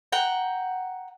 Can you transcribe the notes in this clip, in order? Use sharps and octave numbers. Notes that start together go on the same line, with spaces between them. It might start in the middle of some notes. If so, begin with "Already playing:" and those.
F#5 G5 A#5